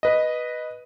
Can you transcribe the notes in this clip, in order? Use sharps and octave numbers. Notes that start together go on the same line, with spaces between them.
B4 D#5